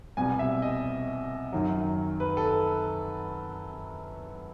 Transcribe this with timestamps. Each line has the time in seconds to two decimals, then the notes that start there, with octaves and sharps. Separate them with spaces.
0.17 C2 B2 G3 G#5
0.39 E5
0.62 D#5
1.52 F#2 D#3 F#3
2.20 B4
2.37 A4